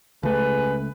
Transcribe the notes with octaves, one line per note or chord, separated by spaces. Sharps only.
C#2 A3 G#4 B4